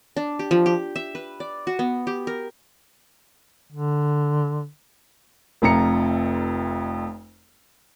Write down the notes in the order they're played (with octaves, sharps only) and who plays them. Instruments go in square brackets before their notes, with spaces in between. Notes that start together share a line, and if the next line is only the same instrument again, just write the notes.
[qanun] D4
G4
F3
G4
E5
B4
D5
F#4
B3
G4
A#4
[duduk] D3
[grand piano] F1 F2 A#5 C#7